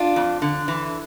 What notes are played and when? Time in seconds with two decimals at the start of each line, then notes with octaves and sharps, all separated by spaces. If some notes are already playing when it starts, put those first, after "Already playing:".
Already playing: D4 F4
0.16 F2
0.42 D3
0.68 E3